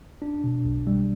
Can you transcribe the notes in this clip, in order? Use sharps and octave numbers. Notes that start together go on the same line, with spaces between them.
D4
B2
B1
G3